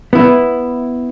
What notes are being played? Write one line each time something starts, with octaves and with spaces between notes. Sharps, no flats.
B3 E4